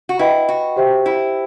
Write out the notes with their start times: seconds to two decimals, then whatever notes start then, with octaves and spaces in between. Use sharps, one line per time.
0.09 F#4
0.19 E4 B4 D#5 G5 B5
0.49 F#4
0.76 G4 C5 E5 G5
1.06 E4